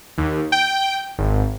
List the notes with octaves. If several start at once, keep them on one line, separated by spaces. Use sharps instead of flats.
D#2
G5
G#1